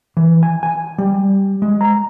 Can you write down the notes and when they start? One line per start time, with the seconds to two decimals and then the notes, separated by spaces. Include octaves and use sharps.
0.17 E3
0.43 G#5
0.63 G#5
0.98 G3
1.62 G#3
1.81 A#5